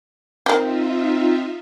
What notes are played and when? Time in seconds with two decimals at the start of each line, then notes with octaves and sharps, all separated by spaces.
0.46 D#3 C4 D#4 F4 G4 E5